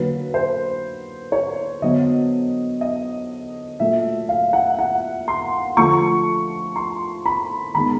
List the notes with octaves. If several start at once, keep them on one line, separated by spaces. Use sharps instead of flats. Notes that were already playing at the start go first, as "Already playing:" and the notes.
Already playing: D3 F#3 A#3 B4
C5
C#5
D3 F#3 B3 D#5
D#5
A#2 F#3 A3 E5
F5
F#5
F#5
C6
D3 F3 A3 C#6
C6
B5
D#3 G#3 B3 B5